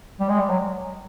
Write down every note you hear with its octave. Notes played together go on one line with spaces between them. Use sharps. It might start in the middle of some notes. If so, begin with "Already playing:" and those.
G3
G#3
G3
F#3